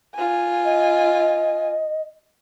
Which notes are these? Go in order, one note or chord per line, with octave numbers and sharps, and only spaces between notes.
F4 G#5
D#5